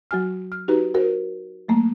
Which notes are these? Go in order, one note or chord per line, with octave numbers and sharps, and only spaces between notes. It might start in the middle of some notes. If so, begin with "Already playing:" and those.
F#3 F#4 G#5 F6
F6
D#4 F#4 G4 B4 A#5
F#4 A#4 C5
F#3 A3 A#3